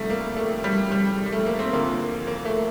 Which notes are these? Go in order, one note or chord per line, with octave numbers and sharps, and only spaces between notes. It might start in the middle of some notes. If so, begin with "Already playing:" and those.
Already playing: C2 C3 F3 G3 A3
A#3
A3
G3
G3
G3
A3
A#3
C4
D2 D3 F3 A#3
A#3
A3